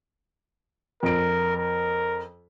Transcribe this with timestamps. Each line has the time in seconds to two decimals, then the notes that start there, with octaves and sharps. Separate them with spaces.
1.03 F2 A#4 D7
1.57 A#4